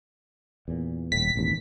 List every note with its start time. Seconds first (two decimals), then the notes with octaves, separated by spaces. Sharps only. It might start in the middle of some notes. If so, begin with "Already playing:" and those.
0.68 E2 A#2
1.12 D#1 A2 B6
1.36 E1 A1 D#2